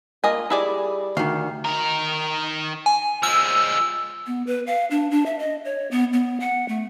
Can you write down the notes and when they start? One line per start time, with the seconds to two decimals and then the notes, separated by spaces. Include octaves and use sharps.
0.24 A#3 F4 D#5 G#5
0.50 G3 E4 G#4 D5
1.17 D2 D#3 F5
1.64 D#3 A#4
2.86 G#5
3.23 F3 G#3 E6
4.27 B3
4.47 B4
4.67 F5
4.91 D4
5.11 D4
5.26 E5
5.39 D#5
5.65 C#5
5.91 B3
6.13 B3
6.40 F#5
6.68 A3